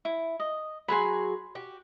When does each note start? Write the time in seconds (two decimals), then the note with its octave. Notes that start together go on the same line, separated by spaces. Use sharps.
0.05 E4
0.40 D#5
0.88 F#3 F#4 G#4 B5 C6
1.55 F#4 G4